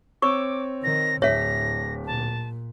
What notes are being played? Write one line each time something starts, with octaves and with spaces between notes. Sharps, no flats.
C4 C#5 C#6 D6 E6
D#3 A#6
D1 A2 C#5 E5 A#6 B6
A#2 A5